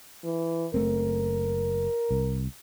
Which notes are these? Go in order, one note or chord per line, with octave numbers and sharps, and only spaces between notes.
E3
F#1 A3 C4 A#4
C2